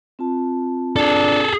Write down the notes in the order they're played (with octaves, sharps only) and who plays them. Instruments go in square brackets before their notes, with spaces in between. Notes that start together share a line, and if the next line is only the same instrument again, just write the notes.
[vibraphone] C4 F4 A5
[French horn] D4 [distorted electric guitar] G#4 A4